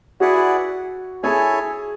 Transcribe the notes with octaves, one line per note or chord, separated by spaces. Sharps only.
E4 F#4 G#4 B4 D5 F#5
E4 G#4 A4 C#5 G#5